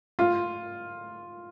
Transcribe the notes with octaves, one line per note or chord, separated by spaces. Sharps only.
F4